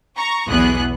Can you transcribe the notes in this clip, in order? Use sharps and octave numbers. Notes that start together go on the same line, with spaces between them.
A#5 C#6
B1 E2 B3 G#4 F#6